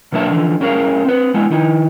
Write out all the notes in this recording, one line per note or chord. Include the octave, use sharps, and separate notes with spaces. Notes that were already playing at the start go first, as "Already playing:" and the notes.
B2 F#3 A#3 D4 E5 A5
D3 E3 F3
G2 C#4 G#4 A#4 F5
C4 B4
G#3 B3 E4
D#3 D#4 E4